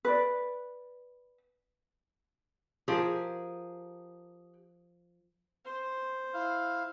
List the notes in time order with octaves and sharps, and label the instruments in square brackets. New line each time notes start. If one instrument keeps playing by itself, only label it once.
[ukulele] B4 D5
[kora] F3 A#4 [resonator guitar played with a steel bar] G4 G#4
[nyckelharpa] C5
[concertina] E4 F5